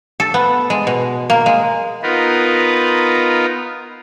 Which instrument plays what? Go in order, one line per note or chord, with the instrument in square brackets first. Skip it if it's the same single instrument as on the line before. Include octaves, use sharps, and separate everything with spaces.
[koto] A4
B3
G#3
B2
A#3
G#3
[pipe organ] B3 D#4 F4 A#4 B4